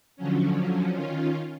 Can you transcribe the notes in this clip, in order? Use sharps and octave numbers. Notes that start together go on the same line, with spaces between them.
D3 F3 F#3 C#4
D#3 C#4 F4